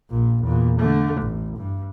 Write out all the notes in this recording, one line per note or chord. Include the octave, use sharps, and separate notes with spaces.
A#1 A#2
E2 A#2
D3 A3
A1
G2